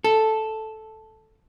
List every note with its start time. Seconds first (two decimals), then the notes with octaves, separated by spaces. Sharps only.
0.04 A4